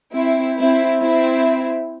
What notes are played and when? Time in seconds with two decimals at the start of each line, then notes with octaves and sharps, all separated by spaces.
0.13 C4 E4
0.57 C4 E4
1.01 C4 E4